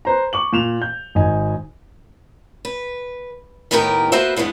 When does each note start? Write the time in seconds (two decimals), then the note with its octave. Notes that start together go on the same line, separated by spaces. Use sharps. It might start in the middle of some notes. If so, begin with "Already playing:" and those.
0.05 B4 C5 A#5
0.33 C#6 D6 F#7
0.53 A#2 E7 F7
0.82 G6
1.15 G#1 D#4 G#5
2.65 B4
3.71 D#2 A2 B3 D#4 G4 A#4
4.12 A#3 B3 F#4 B4 C5 E5
4.36 G2 E3 G#3 B3 D4